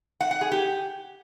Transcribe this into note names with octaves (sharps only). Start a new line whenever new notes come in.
F#5
F#5
G#4
G4